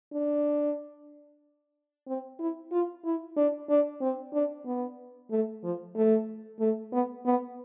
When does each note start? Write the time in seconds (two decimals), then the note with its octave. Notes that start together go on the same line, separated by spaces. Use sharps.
0.13 D4
2.07 C4
2.39 E4
2.72 F4
3.04 E4
3.36 D4
3.69 D4
4.01 C4
4.33 D4
4.65 B3
5.30 A3
5.63 F3
5.95 A3
6.59 A3
6.92 B3
7.25 B3